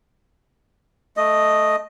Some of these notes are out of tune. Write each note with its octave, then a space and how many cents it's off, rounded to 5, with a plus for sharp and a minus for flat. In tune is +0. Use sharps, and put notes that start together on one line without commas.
A3 -10 D#5 +0